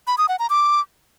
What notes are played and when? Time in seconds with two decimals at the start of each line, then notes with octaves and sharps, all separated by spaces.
0.07 B5
0.18 D#6
0.29 F#5
0.39 A#5
0.50 D6